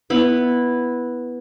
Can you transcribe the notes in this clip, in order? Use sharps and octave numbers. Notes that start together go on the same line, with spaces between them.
B3 E4